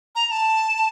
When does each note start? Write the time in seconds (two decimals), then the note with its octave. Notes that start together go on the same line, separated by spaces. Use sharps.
0.15 A#5
0.27 A#5
0.31 A5